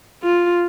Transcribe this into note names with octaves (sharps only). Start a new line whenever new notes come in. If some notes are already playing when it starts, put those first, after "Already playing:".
F4